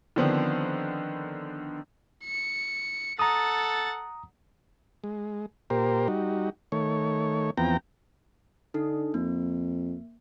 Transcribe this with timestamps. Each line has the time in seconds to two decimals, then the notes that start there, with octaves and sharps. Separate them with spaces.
0.16 D3 D#3 F3 B3 C4 D4
2.24 C#7
3.19 A4 F#5 A#5 D#6 A6
5.04 G#3
5.70 A#2 G4 A#4 C5
6.08 G3 D#4 F#4
6.72 D#3 A3 C#5
7.57 E2 F3 B3 C4 G5 A#5
8.74 D3 D4 D#4 A4
9.14 F2 A#3